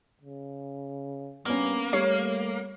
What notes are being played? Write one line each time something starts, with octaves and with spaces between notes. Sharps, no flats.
C#3
G2 A#3 B3 C#4
G3 A3 C#5 C7